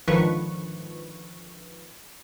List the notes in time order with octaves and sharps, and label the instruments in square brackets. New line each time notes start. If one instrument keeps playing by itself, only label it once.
[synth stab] G#1 D3 D#3 F3 B4 C#6